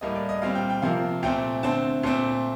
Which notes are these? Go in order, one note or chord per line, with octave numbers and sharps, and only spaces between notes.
A2 G3 A#3 D#5
D5
D#5
A#2 G3 C4 F5
G5
G5
C3 F3 A#3 F5
A#2 A3 C4 G5
D3 A3 C4 A5
A#2 A3 C4